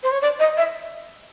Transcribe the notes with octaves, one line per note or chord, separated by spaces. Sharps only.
C5
C#5
D5
D#5
E5